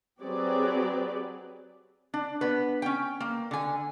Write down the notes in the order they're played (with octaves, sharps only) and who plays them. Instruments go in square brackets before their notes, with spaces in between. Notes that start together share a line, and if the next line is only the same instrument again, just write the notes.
[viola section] F#3 C4 G4 G#4 B4 D5
[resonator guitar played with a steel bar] D4
B3 B4
C#4 G5
A#3
D3 G#5